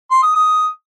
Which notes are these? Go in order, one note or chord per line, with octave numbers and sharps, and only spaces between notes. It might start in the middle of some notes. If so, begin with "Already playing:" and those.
C6
D#6
D#6